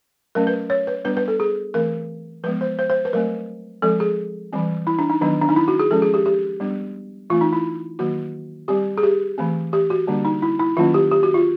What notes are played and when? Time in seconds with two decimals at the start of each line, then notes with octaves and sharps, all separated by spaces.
0.35 F#3 A3 C#4 A#4
0.47 B4
0.70 C#5
0.87 B4
1.05 G3 B3 D4 B4
1.17 B4
1.28 A4
1.40 G#4
1.74 E3 A3 C4 A#4
2.43 F3 G#3 B3 B4
2.61 C5
2.79 C5
2.90 C5
3.05 B4
3.13 F#3 A3 C4 A#4
3.82 F3 G#3 C4 A4
4.00 G#4
4.53 E3 G3 C4
4.87 E4
4.99 D4
5.10 D#4
5.21 D#3 F#3 B3 D4
5.42 D4
5.49 D#4
5.56 E4
5.68 F#4
5.79 G#4
5.91 F3 G#3 C#4 A4
6.02 G#4
6.14 G4
6.26 G4
6.60 G3 B3 D4
7.30 E3 A3 C4 F4
7.41 D#4
7.53 E4
7.99 D#3 F#3 A#3 F#4
8.68 G3 C4 G4
8.97 G#4
9.03 G4
9.38 E3 A3 C4
9.73 G4
9.90 F#4
10.08 D3 G3 A#3 D4
10.25 D#4
10.42 E4
10.59 E4
10.77 D#3 F#3 A#3 C#4 F4
10.94 G4
11.11 G4
11.23 F#4
11.34 F4